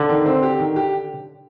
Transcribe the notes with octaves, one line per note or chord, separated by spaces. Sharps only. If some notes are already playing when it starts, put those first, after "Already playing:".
Already playing: D3
D#3
C4
G4
D#3
G4